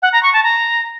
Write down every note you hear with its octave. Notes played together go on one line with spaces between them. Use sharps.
F#5
A#5
C#6
A5
A#5